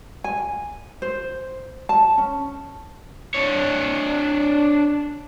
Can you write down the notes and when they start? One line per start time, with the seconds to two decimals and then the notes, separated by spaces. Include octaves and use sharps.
0.24 G#5
1.02 C5
1.89 A5
2.18 C#4
3.34 D4 C#5